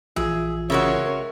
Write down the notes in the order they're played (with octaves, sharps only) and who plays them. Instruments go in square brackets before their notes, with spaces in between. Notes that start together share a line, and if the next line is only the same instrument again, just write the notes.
[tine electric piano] A#1 E3 F4 [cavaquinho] G#4 E5
[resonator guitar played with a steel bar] C#3 G#3 F#4 [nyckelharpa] A#4 C#5 [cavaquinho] E5